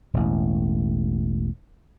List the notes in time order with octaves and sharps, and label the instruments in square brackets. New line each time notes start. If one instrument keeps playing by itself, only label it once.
[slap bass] E1 A1